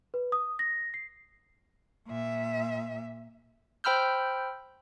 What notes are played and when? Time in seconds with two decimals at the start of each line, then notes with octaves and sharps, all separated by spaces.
0.14 B4
0.32 D#6
0.59 A#6
0.94 C7
2.08 A#2 E5
3.84 C5 G5 B5 E6 F6 G6